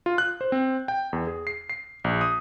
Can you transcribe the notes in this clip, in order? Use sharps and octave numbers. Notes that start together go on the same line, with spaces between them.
F4
F#6
C5
C4
G5
E2
G#4
C7
C7
A#1
D#6